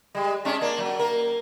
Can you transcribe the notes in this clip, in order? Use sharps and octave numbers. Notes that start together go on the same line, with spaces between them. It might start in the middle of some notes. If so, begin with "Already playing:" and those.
G3 G#3
G#3 C#4 D4
A#3 D4
F#3
A#3 A#4